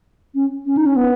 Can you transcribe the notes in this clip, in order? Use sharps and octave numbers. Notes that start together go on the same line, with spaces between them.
C#4
C#4
D#4
C#4
B3